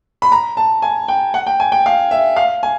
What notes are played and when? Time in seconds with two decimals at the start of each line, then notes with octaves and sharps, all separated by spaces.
0.22 B5
0.32 A#5
0.57 A5
0.82 G#5
1.08 G5
1.34 F#5
1.47 G5
1.60 G#5
1.72 G5
1.86 F5
2.11 E5
2.36 F5
2.63 G#5